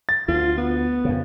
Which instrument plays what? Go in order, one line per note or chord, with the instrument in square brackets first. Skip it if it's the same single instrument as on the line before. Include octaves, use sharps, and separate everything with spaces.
[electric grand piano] A6
[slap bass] D2 [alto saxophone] F4
[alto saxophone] B3
[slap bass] F2 C#3